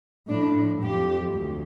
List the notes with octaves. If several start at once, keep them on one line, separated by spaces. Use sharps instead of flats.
A2 F3 D4
F2 F3 G4
D2